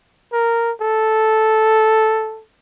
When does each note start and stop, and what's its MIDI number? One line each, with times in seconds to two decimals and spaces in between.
0.32 0.71 70
0.81 2.42 69